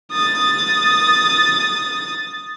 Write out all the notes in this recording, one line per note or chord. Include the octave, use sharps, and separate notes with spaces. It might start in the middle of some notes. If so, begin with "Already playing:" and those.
D#6 A6